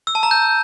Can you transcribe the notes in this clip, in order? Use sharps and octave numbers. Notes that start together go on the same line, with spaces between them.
E6
A5
A#5
G6